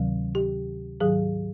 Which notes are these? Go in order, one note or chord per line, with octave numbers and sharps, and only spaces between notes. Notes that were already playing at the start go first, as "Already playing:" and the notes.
Already playing: D2 C3 D#3 F#3
G4
G#2 D#3 F#3 G#4